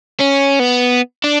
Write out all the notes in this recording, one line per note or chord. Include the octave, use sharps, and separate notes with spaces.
C#4
B3
D4